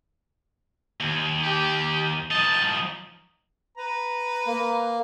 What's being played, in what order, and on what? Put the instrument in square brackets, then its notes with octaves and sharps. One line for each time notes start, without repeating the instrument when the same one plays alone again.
[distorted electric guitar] D#2
[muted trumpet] G4
[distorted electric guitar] F3 D#4 [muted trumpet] A5
[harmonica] B4 A#5
[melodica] A#3